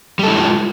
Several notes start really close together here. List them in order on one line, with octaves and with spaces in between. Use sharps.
G3 A4 E4 G#3 F4